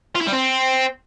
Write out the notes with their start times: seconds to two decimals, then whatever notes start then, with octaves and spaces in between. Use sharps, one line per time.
0.15 F4
0.21 E4
0.27 G3
0.33 C4